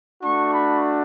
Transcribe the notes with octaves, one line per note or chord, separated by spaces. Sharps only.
A3 D4 F#4 C#6
B5